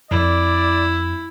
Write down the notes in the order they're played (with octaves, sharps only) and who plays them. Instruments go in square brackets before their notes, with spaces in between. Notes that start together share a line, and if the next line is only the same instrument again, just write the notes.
[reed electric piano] F2 [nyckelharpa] E4 [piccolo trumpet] D5